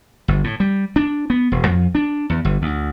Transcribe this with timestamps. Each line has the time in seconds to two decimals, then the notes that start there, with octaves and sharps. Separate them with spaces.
0.28 G1
0.44 A2
0.60 G3
0.96 D4
1.30 B3
1.52 E1
1.66 F2
1.95 D4
2.30 E2
2.45 G1
2.62 D2